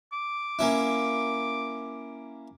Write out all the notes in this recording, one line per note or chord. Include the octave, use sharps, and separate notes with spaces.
D6
A#3 C#4 E4